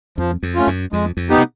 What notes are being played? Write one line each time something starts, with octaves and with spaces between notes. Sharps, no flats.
F2 F3
F2
A3 C#4 F4
F#2
F2 G#3
F2
B3 D#4 G4
C3